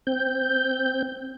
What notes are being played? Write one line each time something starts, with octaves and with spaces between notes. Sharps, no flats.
C4 G6